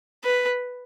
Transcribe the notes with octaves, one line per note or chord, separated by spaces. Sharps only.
B4